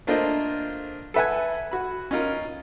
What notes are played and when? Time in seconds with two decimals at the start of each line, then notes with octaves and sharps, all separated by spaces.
0.07 A3 A#3 D4 F4 C5 D#5
1.14 A4 B4 E5 F#5 G#5
1.71 F#4 B5
2.11 C#4 D#4 F4 A#4